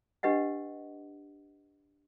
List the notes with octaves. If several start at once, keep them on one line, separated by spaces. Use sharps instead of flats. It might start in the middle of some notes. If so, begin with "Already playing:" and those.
D4 G4 B4 D#5 F#5